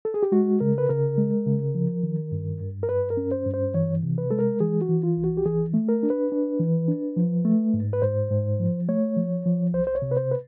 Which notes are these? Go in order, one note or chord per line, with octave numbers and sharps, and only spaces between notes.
A4
G#4
G4
G#3 F#4
C#3 A#4
B4
C#3 A#4
G#3
C#3
F3
D#3
G2
G2
A#4
G2 B4
A#4
C#4
C5
G2
C5
E3 C#5
C3
B4
G#3 A4
A#4
E3 G#4
F#4
E3
F4
C2
F#4
G4
E3 G#4
A3
A#4
D4
B4
D4
E3
D4
F3
A3
G#2
B4
G#2 C5
G#2
F3
A3 C#5
F3
F3
C2 C5
C5
C#5
C3
B4
C5
B4